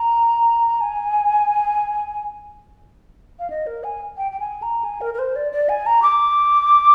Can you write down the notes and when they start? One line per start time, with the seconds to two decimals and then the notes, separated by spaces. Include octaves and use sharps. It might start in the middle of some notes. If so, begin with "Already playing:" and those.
Already playing: A#5
0.81 G#5
3.39 F5
3.50 D#5
3.67 A#4
3.84 G#5
4.17 G5
4.32 G5
4.40 G#5
4.62 A#5
4.84 G#5
5.01 A#4
5.14 A#4
5.19 C5
5.36 D5
5.52 D5
5.69 G#5
5.86 A#5
6.02 D6